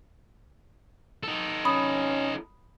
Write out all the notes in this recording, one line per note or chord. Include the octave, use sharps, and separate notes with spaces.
D#4 A4
C#4 B5 D#6